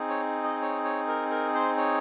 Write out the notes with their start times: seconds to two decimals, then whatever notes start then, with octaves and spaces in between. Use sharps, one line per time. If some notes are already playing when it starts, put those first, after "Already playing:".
Already playing: C4 D#4 G#4
0.09 C#5
0.44 D#5
0.61 C#5
0.84 C#5
1.08 A#4
1.31 A#4
1.54 C5
1.77 C#5